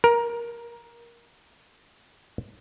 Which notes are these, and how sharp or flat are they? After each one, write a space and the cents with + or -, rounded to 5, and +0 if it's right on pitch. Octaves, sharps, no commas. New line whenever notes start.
A#4 +15